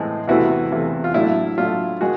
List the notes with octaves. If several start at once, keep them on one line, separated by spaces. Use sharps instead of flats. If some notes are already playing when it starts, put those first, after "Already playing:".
Already playing: A2 E3 G#3 C4
E2 C3 E3 A3 E4 F#4
E2 C3 E3 A3
F4
A2 F#3 A3 D4 E4
A2 F#3 A3 D4 F4
D#3 G#3 F#4 G#4